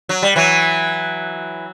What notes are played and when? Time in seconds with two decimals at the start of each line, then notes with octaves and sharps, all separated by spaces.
0.09 F#3
0.22 G3
0.36 E3 F#3